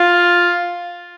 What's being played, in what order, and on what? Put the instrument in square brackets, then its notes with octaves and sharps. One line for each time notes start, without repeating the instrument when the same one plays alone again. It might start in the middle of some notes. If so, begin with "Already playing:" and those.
Already playing: [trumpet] F4